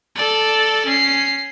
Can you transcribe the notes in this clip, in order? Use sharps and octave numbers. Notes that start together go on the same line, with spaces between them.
A4 D5
C#4 C7